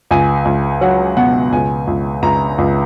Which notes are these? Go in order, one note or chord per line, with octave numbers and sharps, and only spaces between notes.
C#2 G#5
C#2
F#3 F#5
B2 F#5
C#2 G#5
C#2
C#2 A#5
C#2